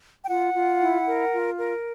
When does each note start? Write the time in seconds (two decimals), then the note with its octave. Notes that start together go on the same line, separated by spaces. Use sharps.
0.24 G5
0.28 F4 F#5
0.54 F4
0.80 E4
1.05 A#4
1.32 F4
1.57 A#4